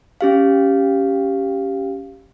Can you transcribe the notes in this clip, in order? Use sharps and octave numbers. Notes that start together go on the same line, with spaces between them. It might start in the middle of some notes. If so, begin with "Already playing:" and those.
C#4 G4 F5